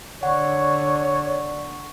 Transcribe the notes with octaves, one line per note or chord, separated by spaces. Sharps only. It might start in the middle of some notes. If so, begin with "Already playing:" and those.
D3 C#5 D5 F#5 C#6